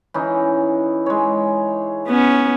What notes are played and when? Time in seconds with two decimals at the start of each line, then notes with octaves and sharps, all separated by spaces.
0.14 E3 C#4 D#4
1.06 G#3 C#5
2.08 B3 C#4